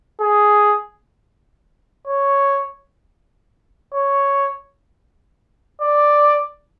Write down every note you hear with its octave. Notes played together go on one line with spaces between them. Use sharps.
G#4
C#5
C#5
D5